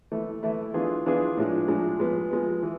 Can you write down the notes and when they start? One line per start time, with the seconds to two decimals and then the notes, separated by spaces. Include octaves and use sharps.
0.12 E3 A3 E4
0.43 E3 A3 E4
0.74 E3 B3 D4 F4 G#4
1.06 E3 B3 D4 F4 G#4
1.37 A2 F3 G#3 D4
1.68 A2 F3 G#3 D4
2.00 F3 G#3 B3
2.31 F3 G#3 B3
2.63 E3